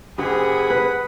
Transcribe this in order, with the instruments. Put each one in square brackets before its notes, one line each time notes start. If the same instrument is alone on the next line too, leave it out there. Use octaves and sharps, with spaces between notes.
[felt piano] F#1 G4 [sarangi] G#4 [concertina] F#5 B5 D#6
[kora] B4